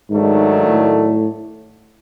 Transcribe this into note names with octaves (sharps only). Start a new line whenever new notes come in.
G#2 D#3 F#3 A3 D4
A2